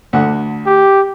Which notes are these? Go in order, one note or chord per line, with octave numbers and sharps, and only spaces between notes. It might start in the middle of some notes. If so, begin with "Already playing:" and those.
D2 D3 F#5
G4